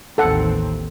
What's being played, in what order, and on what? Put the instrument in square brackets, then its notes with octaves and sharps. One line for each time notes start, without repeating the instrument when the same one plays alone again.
[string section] A1 D#2 C4 [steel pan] A4 F#5